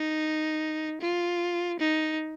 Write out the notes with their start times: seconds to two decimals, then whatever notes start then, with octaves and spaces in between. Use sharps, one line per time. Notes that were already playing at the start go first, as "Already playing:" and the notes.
Already playing: D#4
1.01 F4
1.80 D#4